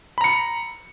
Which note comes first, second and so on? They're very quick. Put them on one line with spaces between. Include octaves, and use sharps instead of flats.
B5 A#5 C#7